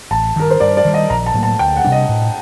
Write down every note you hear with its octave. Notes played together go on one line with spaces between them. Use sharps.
A1 A5
G2 D#3 A#4
C5
G2 D5
D5
D#3 G3
D#5
A#1 A#5
A5
A2 F#3 A#3
A5
D2 G5
F#5
C3 G3 D4
D#5
A2